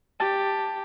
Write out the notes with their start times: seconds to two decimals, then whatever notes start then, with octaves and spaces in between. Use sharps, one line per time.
0.20 G4 A5